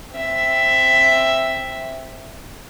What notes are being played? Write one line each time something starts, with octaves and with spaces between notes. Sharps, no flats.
C4 E5